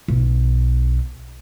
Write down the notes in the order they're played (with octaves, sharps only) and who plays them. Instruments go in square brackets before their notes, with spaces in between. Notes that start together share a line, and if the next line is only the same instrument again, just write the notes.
[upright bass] B1